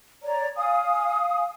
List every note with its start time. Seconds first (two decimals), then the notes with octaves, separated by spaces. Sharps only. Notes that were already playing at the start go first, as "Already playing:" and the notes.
0.23 C#5 D5 A#5
0.56 F5 G#5 D#6